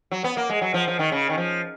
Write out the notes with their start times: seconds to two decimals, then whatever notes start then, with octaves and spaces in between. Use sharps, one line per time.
0.12 F#3
0.24 B3
0.37 A#3
0.50 G#3
0.61 F#3
0.74 F3
0.87 F3
0.99 D#3
1.12 C#3
1.30 D#3
1.38 F3